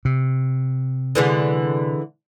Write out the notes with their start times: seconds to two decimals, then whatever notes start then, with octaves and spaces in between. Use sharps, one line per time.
0.05 C3
1.15 D3 E3 G#3